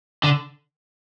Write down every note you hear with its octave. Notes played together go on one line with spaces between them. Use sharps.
D3